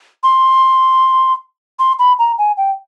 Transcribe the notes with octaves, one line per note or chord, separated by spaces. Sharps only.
C6
C6
B5
A#5
G#5
G5